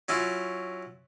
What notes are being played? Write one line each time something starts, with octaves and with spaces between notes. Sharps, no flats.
F#3 C#4 E4 F4